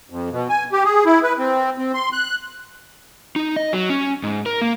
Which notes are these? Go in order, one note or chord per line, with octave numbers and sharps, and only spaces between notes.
F2
B2
G#5
G4
G#4
E4
B4
C4
C4
C6
F#6
D#4
D#5
F#3
C#4
G#2
A#4
A#3